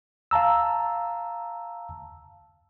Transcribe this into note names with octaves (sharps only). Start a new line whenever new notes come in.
F5 A5 A#5 E6